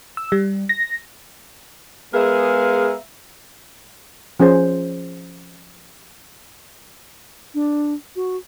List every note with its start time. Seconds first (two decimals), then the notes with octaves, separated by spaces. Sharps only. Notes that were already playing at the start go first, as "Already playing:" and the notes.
0.17 E6
0.32 G3
0.69 A#6
2.14 G#3 B3 G#4 A#4 E5 F5
4.40 F3 C#4 G#4 C5
7.54 D4
8.16 F#4